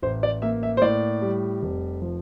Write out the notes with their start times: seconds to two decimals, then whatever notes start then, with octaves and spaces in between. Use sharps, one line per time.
0.02 A1 C5
0.23 D5
0.42 A#3 E5
0.63 E5
0.77 C5
0.82 A2 D5
1.22 G3
1.63 F1
2.02 F3